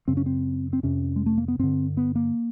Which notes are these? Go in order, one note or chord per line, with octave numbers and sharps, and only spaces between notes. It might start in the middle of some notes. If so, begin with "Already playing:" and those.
F#2 C#3 C4
C#4
C4
C4
F2 C3 C#4
G#3
A3
A#3
B3
G2 D3 C4
B3
A#3